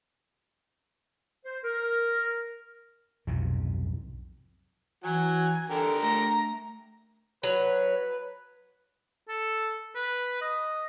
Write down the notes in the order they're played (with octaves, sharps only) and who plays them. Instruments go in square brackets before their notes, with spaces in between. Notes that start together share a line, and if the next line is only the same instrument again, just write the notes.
[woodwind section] C5
A#4
[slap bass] B1 F2 G#2 C3
[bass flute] E3 [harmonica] F#3 F#5 [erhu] G#5
[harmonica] D3 G4 A#4 [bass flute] A4
[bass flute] A3 [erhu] A#5
[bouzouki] F#3 [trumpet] B4
[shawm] A4
B4
D#5